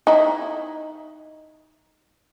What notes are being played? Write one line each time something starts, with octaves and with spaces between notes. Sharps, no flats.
D#4 E4